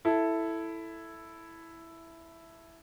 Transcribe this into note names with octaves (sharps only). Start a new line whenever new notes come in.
E4 A4